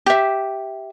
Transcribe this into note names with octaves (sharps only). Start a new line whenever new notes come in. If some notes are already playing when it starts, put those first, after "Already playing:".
G4 E5